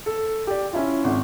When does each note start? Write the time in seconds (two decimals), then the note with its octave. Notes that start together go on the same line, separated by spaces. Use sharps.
0.06 A4
0.47 G4 D5
0.73 C#4 E4 F4
1.04 G#1